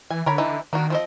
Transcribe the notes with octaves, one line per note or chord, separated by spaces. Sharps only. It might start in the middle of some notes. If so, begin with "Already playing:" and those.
E3 G#5
D3 A#4 C#5 B5
E3 D#4
D#3 A#3 D4 F#4
F3 C4 D#5